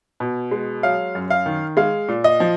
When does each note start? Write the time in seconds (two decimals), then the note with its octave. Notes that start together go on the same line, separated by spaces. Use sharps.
0.20 B2
0.51 G#3
0.83 F#3 F5
1.15 F#2
1.30 F5
1.46 D#3
1.77 G#3 F5
2.09 A#2
2.24 D#5
2.40 F3